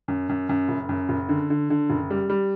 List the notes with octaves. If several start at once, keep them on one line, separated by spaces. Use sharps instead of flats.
F#2
F#2
F#2
F#1
F#2
F#1
D3
D3
D3
F#1
G3
G3